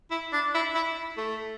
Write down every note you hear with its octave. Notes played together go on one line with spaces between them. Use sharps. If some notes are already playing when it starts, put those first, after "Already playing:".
E4
D4
E4
E4
A3